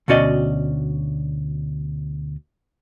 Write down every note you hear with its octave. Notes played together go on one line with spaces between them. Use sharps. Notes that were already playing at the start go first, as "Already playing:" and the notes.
D2 B2 C#4 F#4 D5 D#5